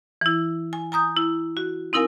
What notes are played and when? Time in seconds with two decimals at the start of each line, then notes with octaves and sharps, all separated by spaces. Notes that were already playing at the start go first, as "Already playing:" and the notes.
0.21 E3 E4
0.73 G#5
0.92 G#5 A#5 D#6 G6
1.17 E4
1.57 F#4
1.93 C4 D#4 E4 A#4 F5 G#5